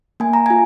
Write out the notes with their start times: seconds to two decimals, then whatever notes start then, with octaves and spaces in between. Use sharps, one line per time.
0.20 A#3 G#5
0.33 A#5
0.46 F4 G#5